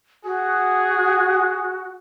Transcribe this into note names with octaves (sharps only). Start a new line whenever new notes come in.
F#4 G#4